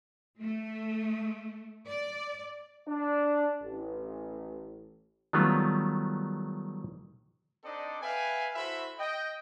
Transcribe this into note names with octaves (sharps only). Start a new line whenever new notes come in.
A3
D5
D4
A1
D#3 F#3 G3 A3 B3 F4
C4 D4 D#4 A4 D5 D#5
B4 E5 F5 G5 G#5
E4 F#4 A4 C5 E5 B5
D#5 G5